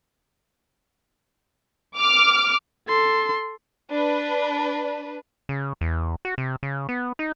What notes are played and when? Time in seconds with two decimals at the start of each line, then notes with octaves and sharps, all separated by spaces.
1.97 D6 F6
2.88 A4 C6
3.90 D4 B4
5.49 C#3
5.81 E2
6.25 F#4
6.38 C3
6.63 C#3
6.89 B3
7.19 D#4